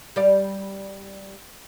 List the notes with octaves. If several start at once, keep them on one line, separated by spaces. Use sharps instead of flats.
G3 D5 F5